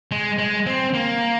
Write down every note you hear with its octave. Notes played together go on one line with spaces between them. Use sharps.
G#3
G#3
C4
A#3